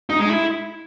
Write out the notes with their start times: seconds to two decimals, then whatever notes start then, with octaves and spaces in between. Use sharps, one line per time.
0.10 D#4
0.20 G#3
0.29 E4